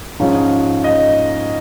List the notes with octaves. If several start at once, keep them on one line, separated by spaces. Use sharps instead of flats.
G#2 F3 G#3 C#4
D#5